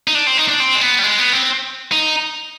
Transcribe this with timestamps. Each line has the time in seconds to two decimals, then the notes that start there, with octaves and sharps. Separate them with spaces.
0.08 D#4
0.15 D4
0.27 C4
0.37 D#4
0.48 D4
0.60 C4
0.75 G#3
0.81 B3
0.99 G3
1.03 G#3
1.18 B3
1.33 C4
1.92 D#4